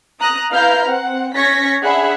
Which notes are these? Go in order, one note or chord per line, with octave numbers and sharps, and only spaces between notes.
A#5 D#6 F#6 A#6
E4 B4 F5 A#5 F6 G6
C4 F#5
C#4 C#5 C#6 G#6 A#6 B6
D4 G#4 E5 F#5 B5